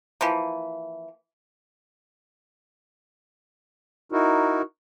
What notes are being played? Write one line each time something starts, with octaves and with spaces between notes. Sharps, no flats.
E3 F3 A#3
D#4 E4 F#4 A#4